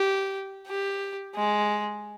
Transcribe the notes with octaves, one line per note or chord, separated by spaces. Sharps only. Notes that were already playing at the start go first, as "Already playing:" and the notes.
Already playing: G4
G4
G#3